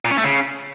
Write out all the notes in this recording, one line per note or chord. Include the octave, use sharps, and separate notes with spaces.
A#2
C#4
A3
C#3